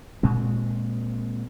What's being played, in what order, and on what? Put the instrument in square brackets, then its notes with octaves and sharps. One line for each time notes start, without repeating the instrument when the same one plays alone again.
[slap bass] A#2 G#3 C4